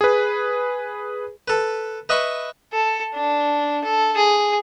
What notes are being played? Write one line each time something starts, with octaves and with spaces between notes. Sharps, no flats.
G#4 B4
A4 B4
B4 D#5 E5 B5 C#6
A4
D4
A4
G#4